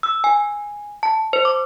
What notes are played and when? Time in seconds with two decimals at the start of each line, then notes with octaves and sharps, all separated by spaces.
0.03 E6
0.24 G#5
1.03 A5
1.33 C5
1.45 D6